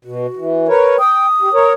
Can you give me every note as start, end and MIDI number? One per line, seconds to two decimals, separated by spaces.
0.05 0.27 47
0.05 0.73 66
0.37 0.68 52
0.68 0.97 70
0.68 0.97 71
0.68 0.97 73
0.99 1.26 79
0.99 1.72 87
1.42 1.49 67
1.54 1.73 70
1.54 1.73 73